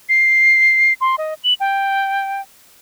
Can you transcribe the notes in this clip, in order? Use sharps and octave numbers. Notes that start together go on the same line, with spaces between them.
C7
C6
D#5
F#7
G5